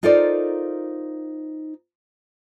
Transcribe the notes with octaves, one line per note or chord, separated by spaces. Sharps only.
D#4 F4 A4 A#4 C5 D5